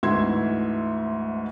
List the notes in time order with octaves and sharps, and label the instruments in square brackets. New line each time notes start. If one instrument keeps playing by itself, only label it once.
[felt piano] D2 G#2 E3 E5 C6 G#6